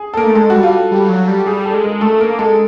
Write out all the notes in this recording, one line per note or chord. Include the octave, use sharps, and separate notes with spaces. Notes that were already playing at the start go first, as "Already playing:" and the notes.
Already playing: G#4
A4
A#3 A#4
A3
G#3 A4
G3 F#4
F4
G3
F#3
G3
G3 G#4
A4
G#3
A#4
A3 A4
A#3 A#4
G#3 A4